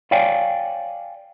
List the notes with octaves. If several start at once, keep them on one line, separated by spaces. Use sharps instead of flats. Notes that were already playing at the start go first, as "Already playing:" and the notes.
C#5 D5 F5 G5 G#5